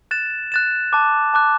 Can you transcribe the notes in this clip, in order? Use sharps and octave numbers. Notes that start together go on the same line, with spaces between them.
F#6 A6 E7
F#6 A6 E7
A5 D6 F#6
A5 D6 F#6